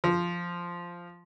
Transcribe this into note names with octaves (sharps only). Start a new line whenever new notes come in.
F3